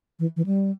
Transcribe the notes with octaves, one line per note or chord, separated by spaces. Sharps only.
E3
E3
G3